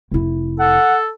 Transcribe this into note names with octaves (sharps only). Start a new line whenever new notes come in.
F1 E4
A4 F#5